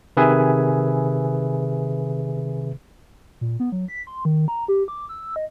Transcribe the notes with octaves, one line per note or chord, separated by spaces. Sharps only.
C3 D#3 G#4 B4 E5 G#5
A#2
B3
F#3
B6
C6
D#3
A#5
G4
D6
E6
D#5